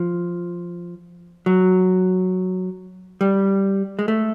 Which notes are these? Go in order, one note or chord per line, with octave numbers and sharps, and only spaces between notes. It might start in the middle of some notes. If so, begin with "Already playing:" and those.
Already playing: F3
F#3
G3
G#3
A3